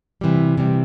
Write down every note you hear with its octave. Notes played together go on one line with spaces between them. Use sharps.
C3 E3 G3
C3 E3 G3